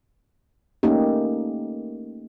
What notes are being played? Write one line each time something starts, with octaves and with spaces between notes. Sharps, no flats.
A3 A#3 C#4 D#4 G4